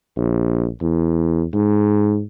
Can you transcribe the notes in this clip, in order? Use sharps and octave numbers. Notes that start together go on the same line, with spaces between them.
A#1
E2
G#2